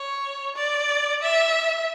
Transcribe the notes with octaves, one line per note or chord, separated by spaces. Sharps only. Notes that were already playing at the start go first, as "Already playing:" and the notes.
Already playing: C#5
D5
E5